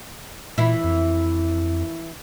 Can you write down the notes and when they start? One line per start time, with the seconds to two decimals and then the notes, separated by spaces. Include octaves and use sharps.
0.58 A#2 E3 E4
0.84 F2